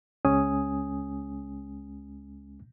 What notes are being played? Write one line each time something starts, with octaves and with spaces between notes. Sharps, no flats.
C#2 G#3 C#4 G#5 D#6